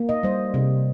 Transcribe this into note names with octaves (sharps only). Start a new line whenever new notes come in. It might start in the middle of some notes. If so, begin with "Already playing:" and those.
Already playing: A#3
D#5
G3 C5
C3